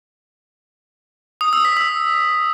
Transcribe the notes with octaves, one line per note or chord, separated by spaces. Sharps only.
D#6
E6
B6
E6